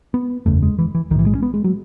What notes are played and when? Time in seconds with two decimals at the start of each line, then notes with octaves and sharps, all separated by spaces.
0.14 B3
0.46 F#1 E2 C#3 A3
0.63 G#3
0.79 E3
0.95 E3
1.10 B1 D#3
1.15 A2 E3
1.26 G#3
1.35 C#4
1.43 B3
1.54 G#3
1.64 F#3